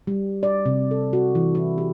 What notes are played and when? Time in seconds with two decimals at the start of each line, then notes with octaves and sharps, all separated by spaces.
0.07 G3
0.43 D5
0.66 C3
0.91 A4
1.13 F#4
1.35 E3
1.55 E4
1.78 G4